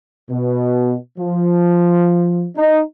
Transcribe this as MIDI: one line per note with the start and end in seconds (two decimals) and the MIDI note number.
0.30 0.94 47
1.18 2.45 53
2.57 2.80 63